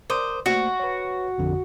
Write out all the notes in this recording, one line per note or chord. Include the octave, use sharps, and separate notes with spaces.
A#4 C5 D6 D#6
A3 A#3 F#4 C5
B4 C#5
A1 F2 D3